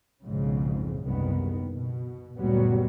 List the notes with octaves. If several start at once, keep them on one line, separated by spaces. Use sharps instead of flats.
B1 F2 G#2 C#3
F#1 C2 D#3 B3
B2
F#1 D2 A#2 F#3 G3 B3